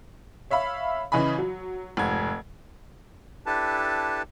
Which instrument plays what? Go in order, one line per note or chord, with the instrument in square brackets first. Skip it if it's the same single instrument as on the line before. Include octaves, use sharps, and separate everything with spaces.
[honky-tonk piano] C#5 E5 F5 B5
C#3 E3 D#5 G#5 B5
F#3
F1 G#2 G#6
[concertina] D4 E4 G4 A4 B4 A5